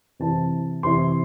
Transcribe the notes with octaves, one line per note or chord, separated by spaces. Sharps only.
C3 E3 C4 E4 A5
C3 E3 C4 E4 C6